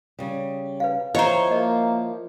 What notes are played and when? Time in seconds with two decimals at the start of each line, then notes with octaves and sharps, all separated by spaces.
0.19 C#3 G3
0.80 B4 F5
1.15 F3 E4 C5 C#5 D#5 F#5 A#5
1.51 A#3 D#5